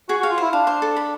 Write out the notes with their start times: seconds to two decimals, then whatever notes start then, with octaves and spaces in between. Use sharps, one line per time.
0.09 F#4 G#4
0.20 F#4
0.23 F5
0.30 F4
0.38 E4 C5
0.53 D4 F5
0.67 C5
0.82 A4
0.96 B5